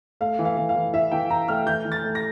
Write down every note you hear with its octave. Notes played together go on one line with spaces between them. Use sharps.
A3 F5
E3
F5
E3
F5
E3
E4 E5
E3 G5
E3 A#5
A3 F6
E3 G6
E3
A6
A3
A#6